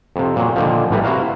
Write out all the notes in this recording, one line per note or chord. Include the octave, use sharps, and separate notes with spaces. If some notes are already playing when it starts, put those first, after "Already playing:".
F2 C3
A#2 F#3
A#2 D3 D#3 F3
A1 E3 G3 B4 A#5
C3 E4 F#4 F5 A#5